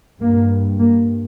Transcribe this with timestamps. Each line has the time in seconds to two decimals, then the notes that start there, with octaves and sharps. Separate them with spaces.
0.21 G2 A#3
0.79 A#3